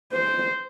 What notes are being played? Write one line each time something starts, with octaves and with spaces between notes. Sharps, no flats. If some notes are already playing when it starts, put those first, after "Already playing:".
C5